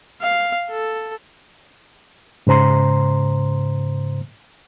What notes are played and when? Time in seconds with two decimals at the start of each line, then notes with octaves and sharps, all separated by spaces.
0.22 F5
0.70 A4
2.47 G#2 C#3 C5 A#5 C6